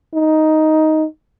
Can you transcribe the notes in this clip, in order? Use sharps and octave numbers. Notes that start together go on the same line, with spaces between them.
D#4